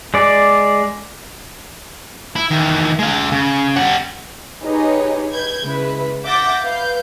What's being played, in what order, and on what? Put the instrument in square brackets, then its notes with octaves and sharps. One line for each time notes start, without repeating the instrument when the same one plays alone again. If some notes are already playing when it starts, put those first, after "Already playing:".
[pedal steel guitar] G#3 D5
[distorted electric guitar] E4
D#3 E3
G#3 F5
C#3
G3 F#5
[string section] D#4 G4 G#4 B4 C#5 D#5
B4 G6 G#6
C#3 G#3 E4 B4
E5 F#5 D6 G6 A6 A#6
B4 F5 G6